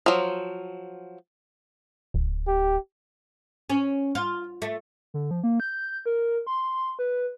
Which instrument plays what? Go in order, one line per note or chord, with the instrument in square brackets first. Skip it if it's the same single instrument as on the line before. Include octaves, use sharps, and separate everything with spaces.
[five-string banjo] F3 F#3
[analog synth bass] D1
[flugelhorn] G4
[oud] C#4
F4
A3
[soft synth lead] D3
F3
A#3
G6
A#4
C6
B4